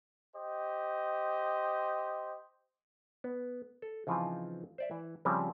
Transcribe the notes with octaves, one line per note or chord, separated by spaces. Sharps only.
G4 C5 D#5
B3
A4
C#3 E3 F3 C4 D#4 F4
C5 D5 E5
E3
C#3 F3 G3 C4 C#4